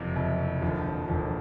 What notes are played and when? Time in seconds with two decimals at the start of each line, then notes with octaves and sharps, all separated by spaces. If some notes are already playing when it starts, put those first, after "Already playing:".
Already playing: F#1 F2 C3
0.16 F#1 F2 C3
0.62 E1 D#2 D3 F3
1.08 E1 D#2 D3 F3